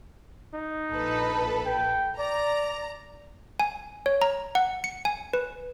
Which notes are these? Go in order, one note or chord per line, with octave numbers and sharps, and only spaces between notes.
D#4
A#1 A4 B4
G5
D5 A#5
G#5
C#5
A#5
F#5
C#7
G#5
B4